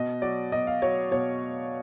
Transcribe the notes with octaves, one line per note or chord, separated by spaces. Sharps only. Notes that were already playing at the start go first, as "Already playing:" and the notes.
Already playing: B2 D#5
F#3 D5
B2 D#5
F5
F#3 C#5
B2 C#5